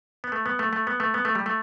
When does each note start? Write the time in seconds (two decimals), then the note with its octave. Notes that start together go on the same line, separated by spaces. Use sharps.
0.24 B3
0.32 A3
0.46 B3
0.59 A3
0.73 A3
0.87 B3
1.00 A3
1.14 B3
1.25 A3
1.35 G3
1.46 A3